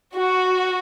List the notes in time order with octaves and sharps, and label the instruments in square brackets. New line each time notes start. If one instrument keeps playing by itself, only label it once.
[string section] F#4